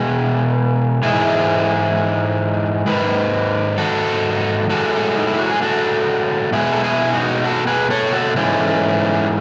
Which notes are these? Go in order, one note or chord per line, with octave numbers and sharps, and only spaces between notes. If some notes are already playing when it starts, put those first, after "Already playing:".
Already playing: B2 G#3 G#4 B4
G#2 E3 G#3 E4 G#4
G#2 D#3 B4
F#4 A4
A2 G#3 F#4 A4
D#4
E4
F#4
G#4
F#4 A4
B2 G#3 E4 G#4
A4
E4 G#4
D#4 F#4
F#4 A4
G#4 B4
A4 C#5
F#4 A4
G#2 E3 G#3 A3 C#4